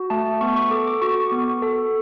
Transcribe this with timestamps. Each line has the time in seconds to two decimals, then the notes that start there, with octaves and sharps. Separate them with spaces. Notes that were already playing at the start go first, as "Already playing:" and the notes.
Already playing: F#4
0.10 A3 A5
0.41 B3 C#6
0.56 C#6
0.71 A4 D6
0.87 D6
1.02 F#4 C#6
1.32 B3
1.62 A4